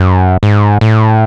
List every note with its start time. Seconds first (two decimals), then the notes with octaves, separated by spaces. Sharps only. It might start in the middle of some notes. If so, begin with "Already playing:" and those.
Already playing: F#2
0.43 G#2
0.81 A2